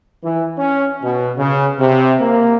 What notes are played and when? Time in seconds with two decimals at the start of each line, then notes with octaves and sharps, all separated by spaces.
0.23 E3
0.58 C#4
1.02 B2
1.38 C#3
1.78 C3
2.20 A#3